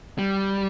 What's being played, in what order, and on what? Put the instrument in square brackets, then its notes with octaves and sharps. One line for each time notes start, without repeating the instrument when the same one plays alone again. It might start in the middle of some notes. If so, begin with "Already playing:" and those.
[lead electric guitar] G3